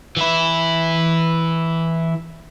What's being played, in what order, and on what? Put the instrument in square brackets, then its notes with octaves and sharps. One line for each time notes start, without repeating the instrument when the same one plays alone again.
[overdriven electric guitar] E3 E4